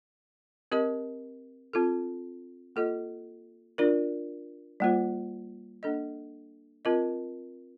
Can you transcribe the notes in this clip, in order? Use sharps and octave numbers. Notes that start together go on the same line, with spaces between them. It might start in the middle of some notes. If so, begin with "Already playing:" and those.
C4 G4 A#4 D#5
C4 F4 A4
A#3 F4 A4 D#5
D4 F4 A#4 D5
G3 A#3 F4 C5
A#3 D4 A4 D#5
C4 F4 A#4 D#5